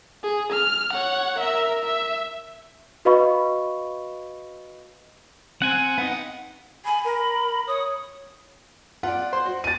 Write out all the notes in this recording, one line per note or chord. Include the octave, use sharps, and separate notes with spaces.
G#4
F6
C#5 F#5
A#4 E5
E5
F#4 B4 D#5 F5 B5 C#6
C4 C5 F#5 G#5
B3 D#4 F5 F#5
G#5 B5
A#4
C#5 D#6
F4 D5 F#5
C5 C6
F#4
A6 D#7